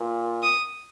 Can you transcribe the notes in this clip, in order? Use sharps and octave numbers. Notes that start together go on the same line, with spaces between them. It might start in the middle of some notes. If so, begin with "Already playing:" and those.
Already playing: A#2
D#6